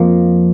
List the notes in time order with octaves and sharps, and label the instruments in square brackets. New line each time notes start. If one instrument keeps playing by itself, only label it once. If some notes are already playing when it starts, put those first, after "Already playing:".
Already playing: [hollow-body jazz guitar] F2 F3 A#3